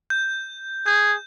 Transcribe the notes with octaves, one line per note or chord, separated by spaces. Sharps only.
G6
G#4 G6